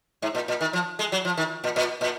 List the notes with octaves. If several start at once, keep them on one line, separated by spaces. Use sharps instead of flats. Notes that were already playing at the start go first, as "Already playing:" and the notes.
G#2
A#2
A#2
D#3
F3
G#3
F#3
F3
D#3
A#2
A#2
A#2